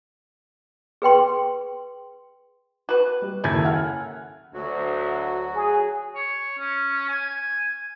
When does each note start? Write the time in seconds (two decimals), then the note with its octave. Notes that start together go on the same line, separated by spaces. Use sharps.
1.02 G#4 B4 G5 C6
2.89 F#4 B4
3.22 G3
3.44 F#1 D#2 C#4 E4 A4 G#6
3.64 F#5 G#5 F6
4.54 D2 F#3 F#4
5.55 G#4
6.15 C#5
6.59 C#4
7.09 G#5